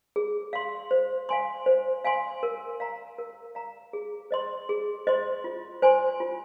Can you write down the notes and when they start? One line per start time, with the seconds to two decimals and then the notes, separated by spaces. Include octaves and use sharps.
0.16 G#4
0.53 F5 C6
0.91 C5
1.29 F5 G#5 C6
1.66 C5
2.04 F5 G#5 C6
2.43 A#4
2.80 F5 A#5
3.18 A#4
3.55 F5 A#5
3.93 G#4
4.31 C5 D#5 C6
4.69 G#4
5.07 C5 D#5 C6
5.44 F4
5.82 C5 G#5 C6
6.20 F4